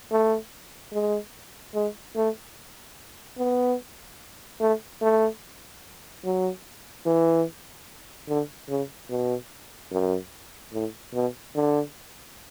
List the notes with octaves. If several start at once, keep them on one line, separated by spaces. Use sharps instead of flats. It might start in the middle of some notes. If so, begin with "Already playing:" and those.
A3
G#3
G#3
A3
B3
A3
A3
F#3
E3
D3
C#3
B2
F#2
A2
B2
D3